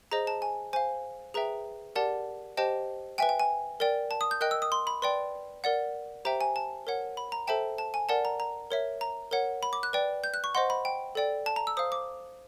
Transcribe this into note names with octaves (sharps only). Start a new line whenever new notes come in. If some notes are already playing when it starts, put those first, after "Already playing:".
G#4 C5 D#5 A#5
A5
G#5
C5 F5 G#5
G#4 B4 E5 G5 A#5
G4 A#4 D5 F#5 A5
G4 C5 D#5 G5 A5
B4 E5 G5 G#5
G5
G#5
A#4 D5 G5
A5
D#6
G6
A#4 D#5 G5 F#6
E6
D#6
C6
B5
B4 D5 G5 C6
A#4 D5 F#5
G4 C5 E5 G5 A#5
G#5
A5
A#4 C#5 F#5
B5
A#5
A4 C5 E5 G5 A5
A5
G#5
A#4 D5 F#5 A5
A#5
A#5
A#4 C#5 E5
A#5
A#4 C#5 F#5
B5
D6
F#6
B4 D5 G5
G6
F#6
C#6
C5 D#5 F#5 C6
B5
G5
A4 D5 G5
A5
A#5
E6
C5 F5 D#6
D6